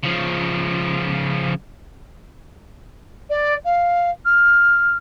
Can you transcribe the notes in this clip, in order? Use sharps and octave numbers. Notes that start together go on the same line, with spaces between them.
C#3 F3
D5
F5
F6